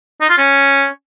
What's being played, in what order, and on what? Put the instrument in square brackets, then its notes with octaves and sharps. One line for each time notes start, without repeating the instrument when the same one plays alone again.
[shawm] D#4
F4
C#4